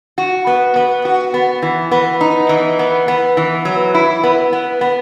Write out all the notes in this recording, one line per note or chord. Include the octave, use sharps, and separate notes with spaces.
F#4
B3
B3
F#4
B3
E3
B3
D#4
E3
B3
B3
E3
F#3
E4
B3
B3
B3